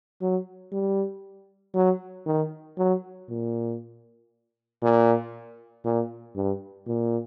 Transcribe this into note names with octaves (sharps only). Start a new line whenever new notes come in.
F#3
G3
F#3
D#3
F#3
A#2
A#2
A#2
G2
A#2